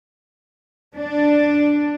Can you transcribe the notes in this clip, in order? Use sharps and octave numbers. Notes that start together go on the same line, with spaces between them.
D4